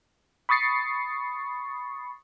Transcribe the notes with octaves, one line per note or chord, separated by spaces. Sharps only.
B5 C#6 D#6 A6 C7 C#7